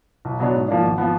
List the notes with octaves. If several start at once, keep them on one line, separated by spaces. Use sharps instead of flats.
B1
B2 F#3 B3 D4
G#2
F3 A#3 D4
G#1
F3 B3